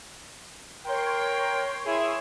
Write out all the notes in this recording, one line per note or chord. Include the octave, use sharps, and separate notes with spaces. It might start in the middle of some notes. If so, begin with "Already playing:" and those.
A#4 C#5 G5 C6
E4 G#4